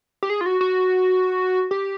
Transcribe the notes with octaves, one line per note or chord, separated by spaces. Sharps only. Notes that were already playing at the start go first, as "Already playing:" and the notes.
G4
G#4
F4
F#4
F#4
G4